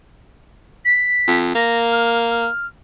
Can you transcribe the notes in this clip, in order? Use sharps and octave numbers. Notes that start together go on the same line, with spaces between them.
B6
F2
A#3 A#6
F6
F6